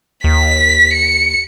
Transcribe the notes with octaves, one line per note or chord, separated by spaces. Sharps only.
D#2 B6
C#7